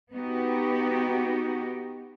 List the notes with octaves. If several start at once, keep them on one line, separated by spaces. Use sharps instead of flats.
B3 D#4 F#4 G4